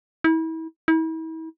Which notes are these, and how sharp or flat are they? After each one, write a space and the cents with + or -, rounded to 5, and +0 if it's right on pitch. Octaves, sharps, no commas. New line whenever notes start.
E4 -35
E4 -40